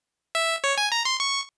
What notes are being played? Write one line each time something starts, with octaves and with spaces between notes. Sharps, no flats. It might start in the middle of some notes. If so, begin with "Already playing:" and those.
E5
C#5
G#5
A#5
C6
C#6